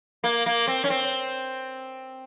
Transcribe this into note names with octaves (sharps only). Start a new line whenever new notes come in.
A#3
A#3
C4
C#4
C4